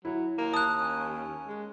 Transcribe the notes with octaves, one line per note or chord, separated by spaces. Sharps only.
F#3 E4
D#2 A#3
A5 D#6 F#6
C#4
G#3